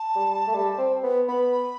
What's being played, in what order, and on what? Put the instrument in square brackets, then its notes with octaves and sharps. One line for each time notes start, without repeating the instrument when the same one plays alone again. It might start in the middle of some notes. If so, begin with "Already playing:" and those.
Already playing: [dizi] A5
[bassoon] G3
A3
G3
C4
B3
[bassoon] B3 [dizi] B5